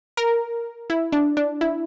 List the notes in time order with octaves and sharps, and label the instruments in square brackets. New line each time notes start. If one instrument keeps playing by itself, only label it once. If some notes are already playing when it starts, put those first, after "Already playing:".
[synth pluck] A#4
E4
D4
D4
E4